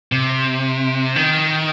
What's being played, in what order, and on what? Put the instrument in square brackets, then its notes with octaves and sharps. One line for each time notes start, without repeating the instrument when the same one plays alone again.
[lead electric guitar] C3
D#3